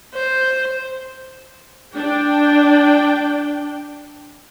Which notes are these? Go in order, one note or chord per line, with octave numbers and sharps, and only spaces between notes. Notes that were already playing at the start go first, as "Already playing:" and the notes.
C5
D4 G5